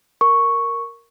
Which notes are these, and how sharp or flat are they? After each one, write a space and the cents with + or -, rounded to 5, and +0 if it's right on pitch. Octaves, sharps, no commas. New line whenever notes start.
A#4 +0 C#6 +0